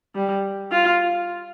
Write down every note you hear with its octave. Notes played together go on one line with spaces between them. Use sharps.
G3
F4